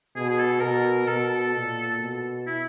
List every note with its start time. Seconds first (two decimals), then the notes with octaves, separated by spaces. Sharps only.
0.16 B2 G#4
0.29 G#4
0.39 A4
0.61 B2 A#4
1.08 B2 A4
1.55 A#2
2.00 B2
2.47 E4